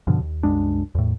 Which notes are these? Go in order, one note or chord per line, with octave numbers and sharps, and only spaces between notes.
G2 B2 D3 F3
D#2
C2 F#2 G#3 D4
E2 A2